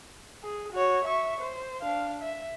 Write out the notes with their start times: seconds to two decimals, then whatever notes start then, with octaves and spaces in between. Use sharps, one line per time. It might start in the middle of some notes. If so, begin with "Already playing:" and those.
0.43 G#4
0.72 F#4 C#5
1.04 E5 C#6
1.41 C5
1.81 D4 F5
2.22 E5